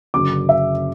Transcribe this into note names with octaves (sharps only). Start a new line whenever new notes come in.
F#1 F#2 D3 F#3 D6
E5